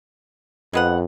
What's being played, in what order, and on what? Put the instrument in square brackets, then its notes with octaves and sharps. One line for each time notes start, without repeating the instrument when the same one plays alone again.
[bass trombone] F2 [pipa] G#3 B3 F#5